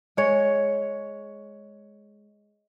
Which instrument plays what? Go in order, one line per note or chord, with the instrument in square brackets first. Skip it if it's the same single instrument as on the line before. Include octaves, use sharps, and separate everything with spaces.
[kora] G#3 C#5